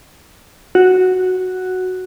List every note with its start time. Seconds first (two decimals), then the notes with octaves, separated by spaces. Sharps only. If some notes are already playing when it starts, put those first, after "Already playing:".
0.75 F#4